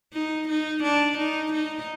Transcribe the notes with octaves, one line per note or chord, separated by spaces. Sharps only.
D#4
D#4
D4
D#4
D#4